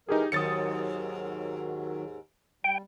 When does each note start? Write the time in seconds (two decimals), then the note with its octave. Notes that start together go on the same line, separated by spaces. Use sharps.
0.09 E3 G#3 D#4 G4 G#4 A#4
0.32 D#2 G#2 D#3 F#3 D#6 A6 C#7
2.64 G3 G5